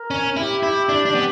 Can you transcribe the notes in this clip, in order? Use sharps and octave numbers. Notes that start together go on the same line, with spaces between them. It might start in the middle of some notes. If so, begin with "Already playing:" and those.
Already playing: A#4
C#4
E4 G4
E4
D4
D4
B3